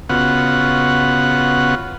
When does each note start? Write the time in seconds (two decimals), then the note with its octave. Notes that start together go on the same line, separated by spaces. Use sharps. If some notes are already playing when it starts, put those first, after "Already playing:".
0.09 C#3 B3 F4 F#4 F#5